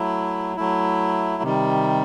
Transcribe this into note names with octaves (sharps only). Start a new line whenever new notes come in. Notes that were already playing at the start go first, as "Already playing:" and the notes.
Already playing: F#3 A3 E4
F#3 A3 E4
C3 D#3 G3